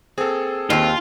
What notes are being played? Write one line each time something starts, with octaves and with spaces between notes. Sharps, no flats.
A#3 C4 G#4 A4
D#2 D#3 C4 F4